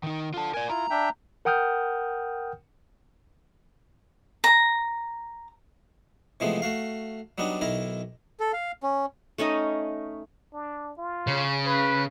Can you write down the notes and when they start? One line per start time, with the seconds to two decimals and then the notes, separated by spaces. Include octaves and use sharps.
0.03 D#3 D#4
0.34 D3 F4 A5
0.54 A#4 D5 G#5
0.69 E4 F4 A#5
0.90 D4 E5 G5
1.45 A#4 F#5 G5 D#6 F6 G6
4.44 A#5
6.40 C3 E3 F3 G#3 A3 B3
6.62 A3 F#4 F5
7.38 F#3 G3 B3 D4 D#4
7.61 B1 D#3 E4 A#4 A#5
8.40 A4
8.53 F5
8.83 C#4
9.38 A3 C#4 D#4 D#5
10.54 D4
10.98 F4
11.27 C#3
11.66 B4